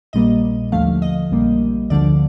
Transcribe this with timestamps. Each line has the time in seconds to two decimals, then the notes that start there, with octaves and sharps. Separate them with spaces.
0.13 A#1 A#2 G3 A#3 D#5
0.72 D#2 D3 F3 A3 F5
1.02 D#5
1.31 A#1 A#2 G3 A#3
1.90 D2 D3 F3 D5